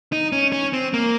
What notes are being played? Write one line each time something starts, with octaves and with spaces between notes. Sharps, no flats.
D#4
C#4
C#4
C4
A#3